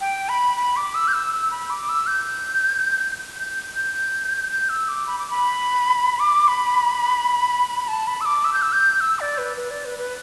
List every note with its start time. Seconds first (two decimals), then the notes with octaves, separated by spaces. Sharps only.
0.01 G5
0.29 B5
0.57 B5
0.76 D6
0.95 E6
1.08 G6
1.13 E6
1.32 E6
1.51 B5
1.70 D6
1.89 E6
2.07 G6
3.39 G6
3.76 G6
4.51 G6
4.69 E6
4.88 D6
5.07 B5
5.18 D6
5.31 B5
6.19 D6
6.48 B5
7.88 A5
8.07 B5
8.21 E6
8.25 D6
8.45 E6
8.53 G6
8.62 E6
8.73 G6
9.01 E6
9.20 D5
9.38 B4
9.57 B4
9.71 D5
9.85 B4
9.99 B4